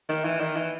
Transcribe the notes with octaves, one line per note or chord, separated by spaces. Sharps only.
D#3
E3
D#3
E3